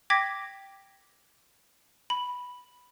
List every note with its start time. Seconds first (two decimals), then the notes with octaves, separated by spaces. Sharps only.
0.10 G5 D6 G#6 A#6 B6
2.10 B5